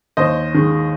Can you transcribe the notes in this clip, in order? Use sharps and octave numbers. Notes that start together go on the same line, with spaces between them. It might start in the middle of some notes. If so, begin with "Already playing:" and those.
D#2 C5 D#5
D#3 G#3